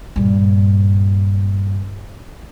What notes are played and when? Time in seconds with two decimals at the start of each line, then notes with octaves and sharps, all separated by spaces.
0.16 G2 A#2